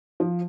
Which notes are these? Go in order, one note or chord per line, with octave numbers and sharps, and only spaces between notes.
F3